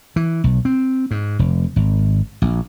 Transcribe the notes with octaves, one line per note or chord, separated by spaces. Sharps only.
E3
B1
C4
G#2
F1
G#1
A#1